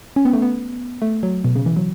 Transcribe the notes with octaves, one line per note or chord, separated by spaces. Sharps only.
C#4
B3
A3
B3
A3
F#3
B2
C#3
E3
F#3